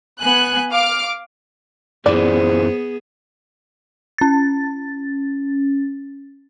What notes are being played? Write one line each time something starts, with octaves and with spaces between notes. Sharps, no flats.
B3 G#5 F#6
F5 D6 F6
F#2 E3 B3 G#4 C5 D5
C#4 A6